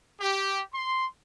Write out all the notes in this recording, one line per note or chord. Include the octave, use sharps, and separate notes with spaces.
G4
C6